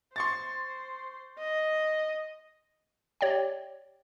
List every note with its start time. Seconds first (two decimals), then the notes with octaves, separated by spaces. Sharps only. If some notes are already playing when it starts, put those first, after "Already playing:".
0.16 C5 C6 C#6 A6
1.39 D#5
3.21 G4 C#5 D5 E5 G5